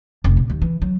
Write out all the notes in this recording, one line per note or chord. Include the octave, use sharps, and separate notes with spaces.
F1
A#2
D#2
E3
F#3